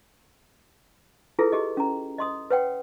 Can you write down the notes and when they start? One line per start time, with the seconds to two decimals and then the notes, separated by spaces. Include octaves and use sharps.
1.39 E4 F4 G#4 A4 B4
1.52 G4 G#4 D#5
1.77 C#4 A#5
2.18 D#5 C6 D#6
2.50 B4 C#5 F#5 G5